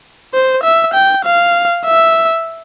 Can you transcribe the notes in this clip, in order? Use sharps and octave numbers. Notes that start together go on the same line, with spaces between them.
C5
E5
G5
F5
E5